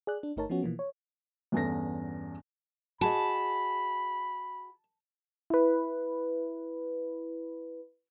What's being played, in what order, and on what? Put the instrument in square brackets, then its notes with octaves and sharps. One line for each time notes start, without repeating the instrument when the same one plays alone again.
[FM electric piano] G#4 D5 F#6
D4
G1 A3 D#4 A#4 C#5 A5
F3 B3 C#4 F#4
B2 E3 F3 A#3
C#5
[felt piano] E2 G2 B3 C#4 A4 A#6
[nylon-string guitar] F#4 G#4 D#5 [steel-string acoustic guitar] A5 [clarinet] B5
[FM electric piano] E4 B4